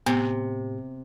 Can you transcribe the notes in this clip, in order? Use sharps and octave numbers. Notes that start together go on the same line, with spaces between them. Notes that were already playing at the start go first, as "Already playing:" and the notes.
A2 C3 B3 G4